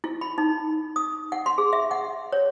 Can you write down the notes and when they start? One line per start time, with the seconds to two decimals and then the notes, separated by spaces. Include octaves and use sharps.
0.04 E4
0.21 B5
0.38 D#4
0.96 D#6
1.32 F#5
1.46 C6
1.58 G#4
1.73 E5
1.91 F#5
2.33 C#5